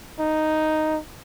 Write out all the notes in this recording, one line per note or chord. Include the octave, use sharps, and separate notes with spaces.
D#4